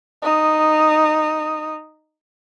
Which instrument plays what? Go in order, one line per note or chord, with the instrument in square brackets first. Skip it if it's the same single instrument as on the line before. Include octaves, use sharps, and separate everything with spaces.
[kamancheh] D#4 D#6